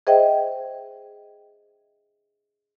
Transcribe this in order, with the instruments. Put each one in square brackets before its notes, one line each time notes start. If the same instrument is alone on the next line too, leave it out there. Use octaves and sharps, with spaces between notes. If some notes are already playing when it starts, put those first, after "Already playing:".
[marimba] G#4 C5 D#5 E5 G5